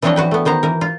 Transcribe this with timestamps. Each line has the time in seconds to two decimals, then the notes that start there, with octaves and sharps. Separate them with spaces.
0.02 E3 F3 C4 D4 C#5 D#5
0.16 E3 F#4 B4 G5
0.31 A3 B3
0.45 D#3 B3 C5 A#5
0.63 E3 A#4
0.81 F4